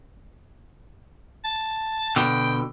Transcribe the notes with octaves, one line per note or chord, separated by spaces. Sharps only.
A5
B2 D3 G5